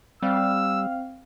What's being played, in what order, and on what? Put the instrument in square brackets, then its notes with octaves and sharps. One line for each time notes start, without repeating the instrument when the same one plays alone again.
[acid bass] G3 [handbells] C4 [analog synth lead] F5 [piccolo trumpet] E6